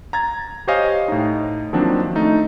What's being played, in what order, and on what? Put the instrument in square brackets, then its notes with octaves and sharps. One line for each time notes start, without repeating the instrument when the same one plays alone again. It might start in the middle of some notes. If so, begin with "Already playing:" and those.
[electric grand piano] A#5 G#6 A6
G4 C5 C#5 D#5 F5 G#5
A2 D#4
D#3 F3 F#3 A#3 C4 D4
A3 D#4